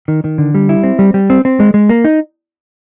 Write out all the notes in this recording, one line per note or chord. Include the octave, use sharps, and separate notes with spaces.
D#3
D#3
D3
G3
E4
C4
G3
G3
C4
C4
G#3
G#3
A#3
D#4